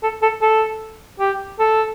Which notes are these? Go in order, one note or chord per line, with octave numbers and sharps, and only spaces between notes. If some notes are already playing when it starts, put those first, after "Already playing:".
A4
A4
A4
G4
A4